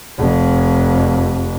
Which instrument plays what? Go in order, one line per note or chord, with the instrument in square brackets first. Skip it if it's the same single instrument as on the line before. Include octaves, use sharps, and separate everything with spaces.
[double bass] F1 F2